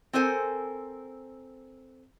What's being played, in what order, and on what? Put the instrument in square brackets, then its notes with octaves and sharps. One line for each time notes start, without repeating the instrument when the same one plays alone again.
[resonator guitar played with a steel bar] C4 A4 A#4 C5 G#5